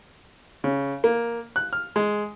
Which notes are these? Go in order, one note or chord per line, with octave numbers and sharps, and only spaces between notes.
C#3
A#3
F#6
F6
G#3